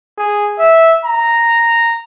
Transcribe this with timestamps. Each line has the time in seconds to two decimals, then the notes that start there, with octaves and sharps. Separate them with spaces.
0.18 G#4
0.59 E5
1.05 A#5